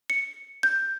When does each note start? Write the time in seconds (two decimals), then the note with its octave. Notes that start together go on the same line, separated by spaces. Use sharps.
0.10 C#7
0.63 G6